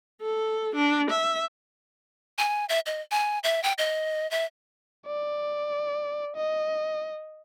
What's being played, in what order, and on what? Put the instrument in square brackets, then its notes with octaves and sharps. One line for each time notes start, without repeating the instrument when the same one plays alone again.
[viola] A4
D4
E5
[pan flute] G#5
E5
D#5
G#5
E5
G5
D#5
E5
[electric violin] D5
D#5